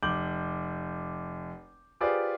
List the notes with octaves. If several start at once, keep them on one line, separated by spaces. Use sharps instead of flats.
F1 D6 G6 F#7
F4 G4 G#4 B4 C5 D5